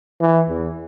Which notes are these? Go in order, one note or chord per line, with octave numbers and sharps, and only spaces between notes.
E3
E2